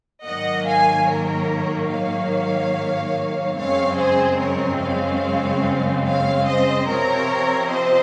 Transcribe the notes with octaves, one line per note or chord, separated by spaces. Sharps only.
G#2 D#3 F#3 A#3 D#5 F#5
F5 G#5
A#4 C#5
C#5 F5
F#2 C#3 G#3 C4 C#5 F5
G#4 C5
A#4 C#5
C#5 F5
C#5 F5
C5 D#5
C3 F3 C4 A#4 C#5
C5 D#5